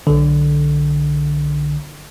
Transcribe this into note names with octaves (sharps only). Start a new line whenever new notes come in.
B1 D3